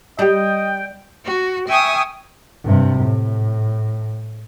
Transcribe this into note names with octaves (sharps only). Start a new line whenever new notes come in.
G3 D4 G4 D#5 G5
F#4
E5 G5 G#5 C#6 D#6
G2 C3
A2